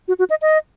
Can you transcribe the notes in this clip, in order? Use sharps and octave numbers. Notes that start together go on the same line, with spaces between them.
F#4
F#4
D#5
D#5